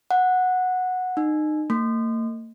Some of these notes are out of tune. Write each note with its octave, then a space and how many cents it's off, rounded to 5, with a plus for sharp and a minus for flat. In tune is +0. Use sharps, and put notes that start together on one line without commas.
F#5 -10
D#4 -30
A#3 -45